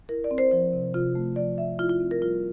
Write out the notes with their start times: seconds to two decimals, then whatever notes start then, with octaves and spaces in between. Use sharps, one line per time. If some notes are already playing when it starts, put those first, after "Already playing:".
0.09 E4 A#4
0.24 D5
0.31 C4
0.38 C5
0.52 F3 C5
0.73 C3
0.94 C3 F4
1.15 A3
1.36 F3 D5
1.58 C3 E5
1.79 E4 F4
1.89 F4
2.00 C4
2.11 A#4
2.22 G3 F4